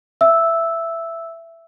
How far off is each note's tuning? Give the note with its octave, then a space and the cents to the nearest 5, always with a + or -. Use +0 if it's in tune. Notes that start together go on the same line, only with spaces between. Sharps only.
E5 +15 E6 -5